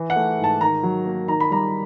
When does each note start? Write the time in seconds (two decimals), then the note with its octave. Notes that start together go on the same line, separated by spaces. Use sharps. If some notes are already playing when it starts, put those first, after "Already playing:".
Already playing: E3 E4
0.10 F#5
0.16 A3
0.39 G#2
0.44 A5
0.61 D#3 A#5
0.83 F#3
1.05 A#3
1.28 D#3 A#5
1.40 B5
1.51 G3 A#5